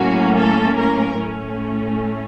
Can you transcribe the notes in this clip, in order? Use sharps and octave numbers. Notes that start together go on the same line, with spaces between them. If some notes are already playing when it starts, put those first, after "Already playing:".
Already playing: A2 F#3 A#3 C#4 F#4
A4
A#4
A2 A3 C#4